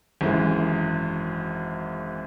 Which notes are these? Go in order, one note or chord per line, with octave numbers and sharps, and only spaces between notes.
G#1 F#2 E3 G#3